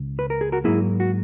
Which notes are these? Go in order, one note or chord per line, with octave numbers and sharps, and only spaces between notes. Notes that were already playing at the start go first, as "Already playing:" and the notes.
Already playing: C#2
B4
A#4
G#4
F#4 A#4
G#2 F#3 A#3 E4 G#4
F#4